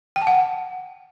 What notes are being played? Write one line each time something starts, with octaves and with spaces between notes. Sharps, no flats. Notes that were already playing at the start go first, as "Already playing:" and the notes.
G5
A5
F#5